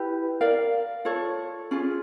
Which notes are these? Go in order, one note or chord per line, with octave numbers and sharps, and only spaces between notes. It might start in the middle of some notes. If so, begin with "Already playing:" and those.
Already playing: E4 G4 B4
A#4 D5 F5
F4 A4 C#5
C#4 F4 G#4